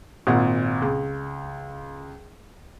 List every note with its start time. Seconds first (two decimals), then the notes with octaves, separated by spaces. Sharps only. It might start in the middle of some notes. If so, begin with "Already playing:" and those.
0.27 G#1 A#2 F#5
0.82 C#2